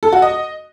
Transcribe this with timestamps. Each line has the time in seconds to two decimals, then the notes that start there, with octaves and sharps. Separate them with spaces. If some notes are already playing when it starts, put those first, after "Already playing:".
0.03 A4
0.12 F#4
0.22 D#5